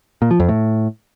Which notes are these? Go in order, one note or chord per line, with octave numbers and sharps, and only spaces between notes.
A#2
F3
F2
A2